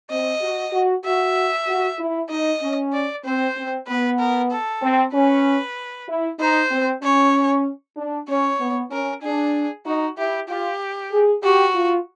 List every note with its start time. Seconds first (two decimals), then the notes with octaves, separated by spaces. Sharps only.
0.10 C4 D#5
0.42 F#4
0.73 F#4
1.04 F#4 E5
1.68 F#4
1.99 E4
2.30 D#4 D#5
2.62 C#4
2.93 D5
3.25 C4 C5
3.57 C4
3.88 B3 B4
4.19 A#4
4.51 A4
4.82 C4
5.14 C#4 B4
6.08 E4
6.39 D#4 C5
6.71 C4
7.02 C#4 C#5
7.97 D4
8.28 C#4 C#5
8.60 B3
8.91 C#4 A#4
9.22 D4 G#4
9.85 D#4 F#4
10.17 E4 G4
10.49 F4 G4
11.12 G#4
11.43 F#4 G4
11.75 F4